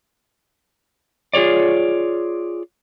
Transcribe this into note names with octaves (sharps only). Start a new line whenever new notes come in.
F4 G#4 A4 C#5 D5